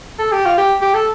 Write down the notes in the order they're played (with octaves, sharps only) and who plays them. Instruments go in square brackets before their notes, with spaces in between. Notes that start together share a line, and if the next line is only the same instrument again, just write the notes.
[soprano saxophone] A4
G4
F4
G4
G4
A4